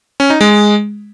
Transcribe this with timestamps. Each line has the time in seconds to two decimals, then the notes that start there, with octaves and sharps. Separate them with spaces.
0.20 C#4
0.30 D#4
0.41 G#3